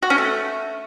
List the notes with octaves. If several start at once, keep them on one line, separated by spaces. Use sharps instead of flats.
F#4
C#4
A3